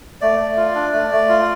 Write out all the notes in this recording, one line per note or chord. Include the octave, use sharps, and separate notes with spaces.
A3 D5
A3
F4
D4
A3
A3
F4